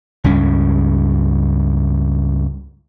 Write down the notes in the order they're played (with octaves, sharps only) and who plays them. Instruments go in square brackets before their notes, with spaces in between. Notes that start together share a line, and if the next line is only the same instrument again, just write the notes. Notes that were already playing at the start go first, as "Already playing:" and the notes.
[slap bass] C#2 G2 C#4